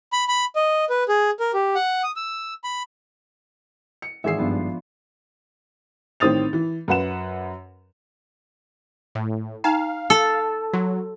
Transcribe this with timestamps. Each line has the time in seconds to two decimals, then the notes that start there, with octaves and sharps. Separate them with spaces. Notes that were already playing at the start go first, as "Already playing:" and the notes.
0.13 B5
0.28 B5
0.56 D#5
0.89 B4
1.09 G#4
1.40 A#4
1.54 G4
1.75 F#5
2.03 D#6
2.16 E6
2.64 B5
4.02 C#7
4.24 G#1 E3 G#4 E5 E6 C7
4.38 G2 D#3 F3 B3 D4
6.20 A1 D#3 C4 D#6 A6 F7
6.53 E3
6.88 F#2 B4 F#5 E7
9.15 A2
9.64 D#4 F5 G5 A#5
10.10 A4
10.73 F#3 F#4